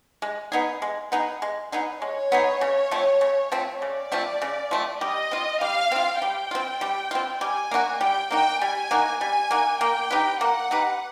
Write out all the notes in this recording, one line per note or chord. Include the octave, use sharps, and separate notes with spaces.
G#3
B3 D#4 G#4
G#3
B3 D#4 G#4
G#3
B3 D#4 G#4
G#3 C#5
B3 D#4 G#4
C#3
F3 A3 C4
C#3
F3 A3 C4
C#3 D5
F3 A3 C4
C#3
F3 A3 C4
G3 D#5
C4 F4
G3 F5
C4 F4
G3 G5
C4 F4
G3
C4 F4
G3 G#5
A#3 D#4 F#4
G3 G5
A#3 D#4 F#4 G5
G3 G#5
A#3 D#4 F#4
G3 G#5
A#3 D#4 F#4
A#3 G5
D#4 G4 B4
A#3 F#5
D#4 G4 B4